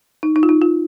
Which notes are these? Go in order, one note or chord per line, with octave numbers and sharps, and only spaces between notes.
D#4
D#4
F4
D#4
F4